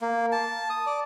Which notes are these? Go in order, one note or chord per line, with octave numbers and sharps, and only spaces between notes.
A#3
A5
D#6
D5